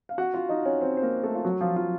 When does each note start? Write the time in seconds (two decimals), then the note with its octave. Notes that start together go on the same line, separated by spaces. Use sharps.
0.09 F5
0.18 F#4 F#5
0.34 F4 F5
0.49 D#4 D#5
0.65 C#4 C#5
0.81 C4 C5
0.97 C5
1.02 A#3 A#4
1.23 A3 A4
1.35 F4
1.44 F#3 F#4
1.61 F3 F4
1.76 F3 F4